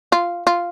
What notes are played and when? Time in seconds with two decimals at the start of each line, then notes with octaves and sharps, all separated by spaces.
0.12 F4
0.47 F4